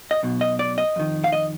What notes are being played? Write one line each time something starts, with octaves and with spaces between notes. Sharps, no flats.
D#5
B1 B2
D#5
D5
D#5
F2 D#3
F5
D#5